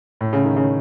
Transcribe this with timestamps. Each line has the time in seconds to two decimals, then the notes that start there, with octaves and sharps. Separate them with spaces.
0.21 A2
0.33 C#3
0.44 D#3
0.57 C#3